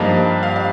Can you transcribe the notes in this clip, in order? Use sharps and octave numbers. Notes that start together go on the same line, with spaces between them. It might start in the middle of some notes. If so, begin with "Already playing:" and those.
Already playing: G2 F3 A#3 D#4 F5
F5
F5